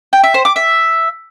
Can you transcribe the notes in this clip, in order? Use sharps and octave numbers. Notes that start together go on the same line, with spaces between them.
G5
E5
C5
D6
E5